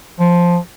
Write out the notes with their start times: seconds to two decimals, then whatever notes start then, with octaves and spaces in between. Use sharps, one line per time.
0.20 F3